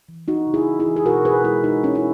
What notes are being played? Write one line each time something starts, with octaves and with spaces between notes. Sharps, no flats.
E3
E3 D#4 F#4
C#3
E4 G#4
E3
E4 G#4
E3
G#4
B2 F#4 A#4
B2 G#4 B4
G#3 E4 G#4
G#3 D#4 F#4
G#3 C#4 E4
E4